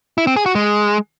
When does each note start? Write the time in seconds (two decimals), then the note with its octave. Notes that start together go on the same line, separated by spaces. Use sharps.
0.18 E4
0.27 C4
0.36 G#4
0.46 F#4
0.55 G#3